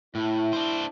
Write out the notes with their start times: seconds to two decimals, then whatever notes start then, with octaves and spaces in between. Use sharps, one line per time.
0.15 A2 E4
0.53 D4 C5